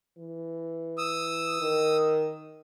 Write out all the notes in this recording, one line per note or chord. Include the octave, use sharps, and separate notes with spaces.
E3
D#6 E6
D#3